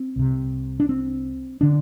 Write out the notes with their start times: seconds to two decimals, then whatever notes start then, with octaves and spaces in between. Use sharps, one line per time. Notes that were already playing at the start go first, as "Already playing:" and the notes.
Already playing: C4
0.16 C2 C3
0.80 D4
0.89 C4
1.61 D3 D4